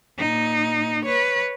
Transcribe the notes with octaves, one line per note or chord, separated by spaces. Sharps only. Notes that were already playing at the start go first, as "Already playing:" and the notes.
A#2 D#4
B4 C#5